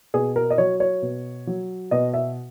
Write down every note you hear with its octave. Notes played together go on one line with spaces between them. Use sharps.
B2 G#4
A#4
D#5
F#3 C#5
C#5
B2
F#3
B2 D#5
E5